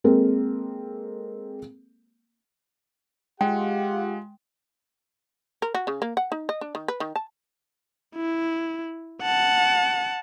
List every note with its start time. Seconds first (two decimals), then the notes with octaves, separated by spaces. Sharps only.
0.04 G#3 A#3 C4 A4 A#4
3.41 G#3 F4 G4 F#5 G5
5.62 A#4
5.75 F#4
5.87 C#3
6.02 A#3
6.17 F#5
6.32 D#4
6.49 D#5
6.61 D4
6.75 D#3
6.88 B4
7.00 D#3
7.16 A5
8.16 E4
9.22 F#5 A5